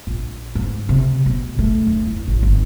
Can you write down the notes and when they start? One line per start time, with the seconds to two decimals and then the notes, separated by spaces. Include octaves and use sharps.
0.07 A#1
0.55 G#2
0.89 C3
1.26 B2
1.59 A3
1.87 D#2
2.07 E2
2.28 A1
2.43 G1